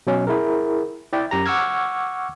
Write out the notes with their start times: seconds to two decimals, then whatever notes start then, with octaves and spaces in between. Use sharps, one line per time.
0.07 B2 F#3 C#4
0.27 E4 G#4 A#4
1.13 E4 D5 E5 G5
1.31 F#2 G4 A#5
1.46 F#5 C#6 D6 E6 F6 G#6